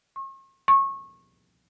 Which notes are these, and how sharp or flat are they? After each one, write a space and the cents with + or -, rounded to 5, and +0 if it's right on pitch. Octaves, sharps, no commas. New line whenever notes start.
C#6 -45
C#6 -25